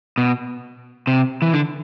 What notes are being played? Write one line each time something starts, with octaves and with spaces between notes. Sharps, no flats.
B2
C3
E3
D3